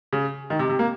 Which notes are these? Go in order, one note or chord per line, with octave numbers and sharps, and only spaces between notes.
C#3
D#3
C3
C3
A#3